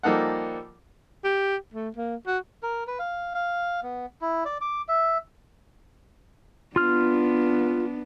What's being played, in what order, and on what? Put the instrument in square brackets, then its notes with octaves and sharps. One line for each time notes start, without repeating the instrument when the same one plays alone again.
[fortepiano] F3 G3 A#3 D#4 A4 F#5
[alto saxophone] G4
A3
A#3
F#4
[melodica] A#4
B4
F5
F5
B3
E4
D5
D6
E5
[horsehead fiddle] B3 D4 [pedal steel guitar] F4 F6